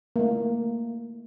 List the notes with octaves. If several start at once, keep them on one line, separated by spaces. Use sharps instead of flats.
A3 A#3